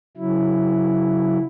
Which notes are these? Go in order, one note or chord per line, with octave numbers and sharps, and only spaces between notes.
C#3 F#3 E4